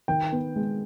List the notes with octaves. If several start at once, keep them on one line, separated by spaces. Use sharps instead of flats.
D#3 G5
B3
G#3